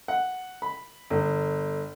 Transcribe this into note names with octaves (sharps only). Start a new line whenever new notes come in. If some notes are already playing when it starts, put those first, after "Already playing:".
F#5
B5
G1